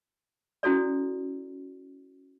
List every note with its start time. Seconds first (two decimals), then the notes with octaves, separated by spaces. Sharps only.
0.63 C#4 E4 F#4 A4 D5